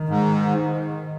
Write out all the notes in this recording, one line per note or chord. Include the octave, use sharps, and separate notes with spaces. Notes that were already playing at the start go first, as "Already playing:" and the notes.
Already playing: D#3
G#2